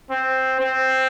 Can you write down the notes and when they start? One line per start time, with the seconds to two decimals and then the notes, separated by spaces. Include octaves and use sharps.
0.10 C4
0.60 C4